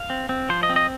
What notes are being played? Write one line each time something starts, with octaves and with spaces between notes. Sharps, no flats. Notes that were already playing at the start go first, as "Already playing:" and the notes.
Already playing: F5
C4
C4
F3 C5
D#5
C4
D#5